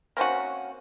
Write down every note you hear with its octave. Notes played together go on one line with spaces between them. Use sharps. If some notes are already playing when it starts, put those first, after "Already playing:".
A#3 C4 C#4 F#4